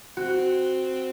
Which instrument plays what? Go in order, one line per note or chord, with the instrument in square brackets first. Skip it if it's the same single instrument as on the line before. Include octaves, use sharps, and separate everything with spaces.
[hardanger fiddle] C4 [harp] F#4